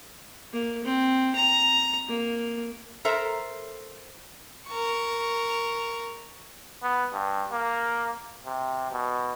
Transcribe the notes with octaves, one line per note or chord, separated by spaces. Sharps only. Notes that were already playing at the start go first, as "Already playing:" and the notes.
A#3
C4
A#5
A#3
A4 A#4 C5 E5 A#5
A#4 C#6
B3
G2
A#3
C3
B2